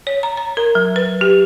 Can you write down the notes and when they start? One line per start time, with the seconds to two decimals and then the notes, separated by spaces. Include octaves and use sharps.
0.07 C#5
0.23 A#5
0.37 A#5
0.57 A#4
0.75 F#3
0.96 B4
1.21 G4